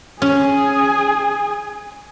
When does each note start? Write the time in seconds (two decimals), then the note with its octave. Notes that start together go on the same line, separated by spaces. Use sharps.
0.22 C#4 G#4 G#5